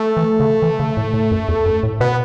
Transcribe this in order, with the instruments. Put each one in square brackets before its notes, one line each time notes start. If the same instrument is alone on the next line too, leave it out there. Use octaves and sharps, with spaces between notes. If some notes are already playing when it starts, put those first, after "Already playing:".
Already playing: [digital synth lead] A3
[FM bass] E3
C#3
E3
C#3
A2
A2
F#2
E2
F#2
A2
[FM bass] B2 [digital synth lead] B3